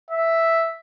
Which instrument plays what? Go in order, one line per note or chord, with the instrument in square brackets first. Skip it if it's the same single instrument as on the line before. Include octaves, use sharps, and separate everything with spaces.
[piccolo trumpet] E5